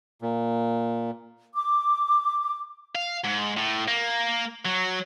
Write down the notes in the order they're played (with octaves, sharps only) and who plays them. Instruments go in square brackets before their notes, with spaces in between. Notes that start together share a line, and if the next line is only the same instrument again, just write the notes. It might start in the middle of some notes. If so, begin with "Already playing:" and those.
[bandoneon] A#2
[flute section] D6
[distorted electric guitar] F5
G#2
A2
A#3
F#3